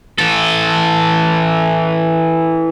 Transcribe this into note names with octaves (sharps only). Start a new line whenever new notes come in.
E3 A4